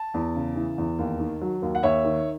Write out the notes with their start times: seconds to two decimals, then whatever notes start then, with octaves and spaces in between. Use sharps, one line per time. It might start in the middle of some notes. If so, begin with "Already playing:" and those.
Already playing: A5
0.14 E2
0.35 C#3
0.56 E3
0.78 E2
0.99 D#2
1.20 D#3
1.41 F#3
1.62 D#2
1.75 F#5
1.83 D#2 C#5 E5
2.05 D#3